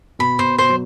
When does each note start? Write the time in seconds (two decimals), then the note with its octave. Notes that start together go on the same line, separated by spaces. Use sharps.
0.19 B2 B5
0.39 B2 C5
0.58 B2 C5
0.69 F#3